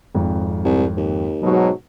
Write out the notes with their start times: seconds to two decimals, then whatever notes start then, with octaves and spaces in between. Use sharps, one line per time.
0.15 G#1 F2
0.65 C2
0.97 D#2
1.42 G#2 B2 F#3